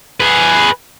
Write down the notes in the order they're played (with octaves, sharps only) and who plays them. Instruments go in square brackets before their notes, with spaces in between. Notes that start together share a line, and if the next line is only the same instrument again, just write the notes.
[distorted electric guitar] G#4 B4